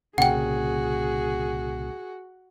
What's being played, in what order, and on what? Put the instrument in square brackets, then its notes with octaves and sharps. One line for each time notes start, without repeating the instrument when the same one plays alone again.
[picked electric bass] C2 A#2 C#3 [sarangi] F#4 [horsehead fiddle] G#4 [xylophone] F#5 G5